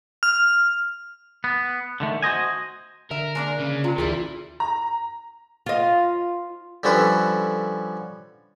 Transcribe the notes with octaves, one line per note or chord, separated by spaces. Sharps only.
F6
B3
D3 D#3 A3
F#4 C5 D#5 G#5
D3 A#4 E5
G#3 A#3 D4
C#3
C3 F4 A#4
D2 A#2 D3 E3 G3 E4 G#4
A#5
F4 D#5
D3 F3 G3 C#4 A4 B4